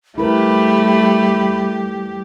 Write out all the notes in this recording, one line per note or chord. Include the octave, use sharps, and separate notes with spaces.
G3 A3 E4 G4 A#4 B4 B5